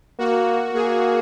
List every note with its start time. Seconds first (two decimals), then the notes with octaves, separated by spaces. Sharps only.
0.19 A#3 F#4
0.74 A#3 G#4